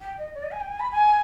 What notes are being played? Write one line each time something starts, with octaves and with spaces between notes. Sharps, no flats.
G5
D#5
D5
D#5
G#5
G5
G#5
B5
G#5